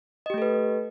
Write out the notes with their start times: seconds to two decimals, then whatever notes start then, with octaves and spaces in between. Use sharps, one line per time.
0.26 D#5
0.30 G4
0.34 A3
0.38 A4
0.42 B4